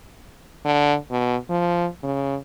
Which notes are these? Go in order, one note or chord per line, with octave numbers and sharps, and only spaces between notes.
D3
B2
F3
C#3